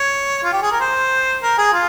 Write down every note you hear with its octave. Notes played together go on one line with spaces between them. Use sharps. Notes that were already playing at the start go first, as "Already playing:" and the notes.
Already playing: C#5
F4
G4
G#4
A#4
C5
A#4
G#4
F4